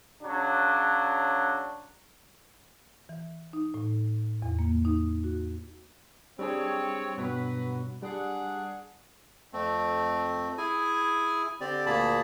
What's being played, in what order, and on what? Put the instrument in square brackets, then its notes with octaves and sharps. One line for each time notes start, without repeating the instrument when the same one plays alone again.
[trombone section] C#3 F#3 D4
[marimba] E3
D#4
A2
E2
A#3
D#4
F#4
[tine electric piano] G3 D4 G#4 [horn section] C4 C#5
[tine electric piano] G2 B2 [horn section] F#3 F#4 B4
[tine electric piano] G3 [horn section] D4 G#4 F#5
[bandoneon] F2 A3 C4
E4 G#4 G#5
D3 C4 G4 D5
D2 A#2 A#3 G#4 A5 B5